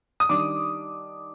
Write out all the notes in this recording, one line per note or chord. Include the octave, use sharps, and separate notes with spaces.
D#6
D#3 G3 D4 D6